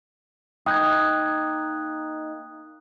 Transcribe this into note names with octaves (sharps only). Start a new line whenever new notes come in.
A#3 D#4 G5 D#6 F#6 G#6